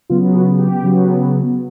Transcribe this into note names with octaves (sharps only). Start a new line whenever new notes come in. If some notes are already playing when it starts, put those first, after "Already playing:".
C#3 F#3 B3 F4
F#4
G4
C#3 F#3 B3